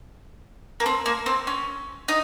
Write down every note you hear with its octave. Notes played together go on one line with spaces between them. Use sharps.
A#3
C4
A#3
C4
C#4
D#4